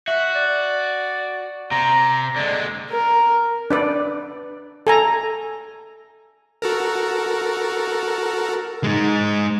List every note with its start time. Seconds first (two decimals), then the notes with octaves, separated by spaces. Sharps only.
0.08 F#4 E5
0.35 D5
1.72 C3 A#5
2.36 D3 G#3 D5
2.91 A#4
3.70 D4 B4 D5
4.87 A4 G#5 A#5
6.62 F#4 A4 A#4
8.84 G#3 D#4